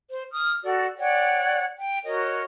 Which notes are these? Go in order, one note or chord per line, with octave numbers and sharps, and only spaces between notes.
C5
D#6 F6
F#4 A4 D5
C#5 D5 F#5 G5
G5
F#4 A#4 C#5 D#5